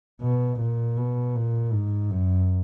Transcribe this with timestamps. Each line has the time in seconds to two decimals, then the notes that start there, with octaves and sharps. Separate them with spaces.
0.22 B2
0.60 A#2
0.97 B2
1.35 A#2
1.73 G#2
2.10 F#2